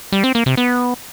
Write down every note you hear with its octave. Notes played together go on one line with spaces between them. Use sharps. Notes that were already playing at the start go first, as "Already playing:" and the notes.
G3
C4
A#3
C3
B3